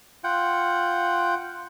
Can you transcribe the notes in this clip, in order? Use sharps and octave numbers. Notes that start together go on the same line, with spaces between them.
F4 F#5 G5